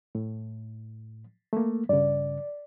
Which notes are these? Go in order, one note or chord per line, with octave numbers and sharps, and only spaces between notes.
A2
A3 A#3
G2 C#3 D5